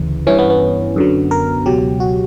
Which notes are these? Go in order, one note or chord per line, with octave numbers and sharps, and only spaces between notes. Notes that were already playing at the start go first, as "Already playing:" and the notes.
Already playing: D2 C#3 E3
G2 E3 C#4
B3
B3
F#2 D3 F#3
A#4
C#2 B2 F#3 G4
F#4